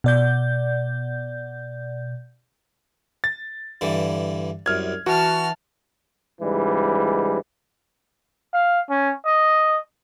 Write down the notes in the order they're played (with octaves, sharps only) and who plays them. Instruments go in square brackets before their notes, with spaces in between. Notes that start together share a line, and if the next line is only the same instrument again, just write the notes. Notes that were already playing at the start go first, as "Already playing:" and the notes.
[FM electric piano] B2 D5 G6
[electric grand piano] A6
[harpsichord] G2 D3 E3
[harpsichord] C2 F#2 [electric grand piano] F6 G#6
[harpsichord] E3 [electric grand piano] F#4 [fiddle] A5 F6
[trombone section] C#2 G#2 E3 G3
[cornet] F5
C#4
D#5